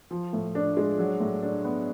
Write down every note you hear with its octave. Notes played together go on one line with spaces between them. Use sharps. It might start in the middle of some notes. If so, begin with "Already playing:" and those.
F3
A2
D4
G#3
F#3
A2
D4
B3